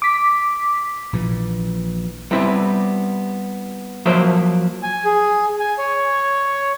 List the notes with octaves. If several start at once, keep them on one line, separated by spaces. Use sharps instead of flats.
D6 B6
A#1 A#2 E3
G3 B3 C4 E4
F3 F#3 A#3 C5 C#5 E5
G#5
G#4
G#5
C#5